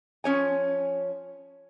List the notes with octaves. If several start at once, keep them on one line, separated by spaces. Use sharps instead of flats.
F3 C#4 C#5 G#5